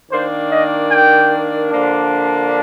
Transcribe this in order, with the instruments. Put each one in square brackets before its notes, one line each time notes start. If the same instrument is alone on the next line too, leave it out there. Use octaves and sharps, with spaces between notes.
[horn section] D#3 A#3 D4 C5
D#5
G5
D3 F3 A#3 D4